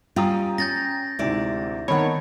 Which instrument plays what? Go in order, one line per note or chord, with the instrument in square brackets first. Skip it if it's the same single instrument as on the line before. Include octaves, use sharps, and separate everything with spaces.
[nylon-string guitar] G3 C#4 F4 [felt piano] G5 A#5 D#6
[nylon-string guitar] C#4 [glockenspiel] G6 A6 A#6
[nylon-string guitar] D2 E4 D5 [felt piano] G#2 C3
[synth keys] D#3 C#5 [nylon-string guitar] B3 C4 [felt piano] F#5 A5 B5